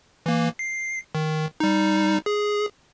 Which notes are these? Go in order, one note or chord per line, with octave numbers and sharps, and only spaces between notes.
E3 A#3
C7
D#3
G3 D#4
G#4